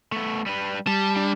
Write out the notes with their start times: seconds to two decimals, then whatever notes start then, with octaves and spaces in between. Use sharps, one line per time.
0.12 A3 B3
0.46 G3 B4
0.87 G3 A5
1.16 D4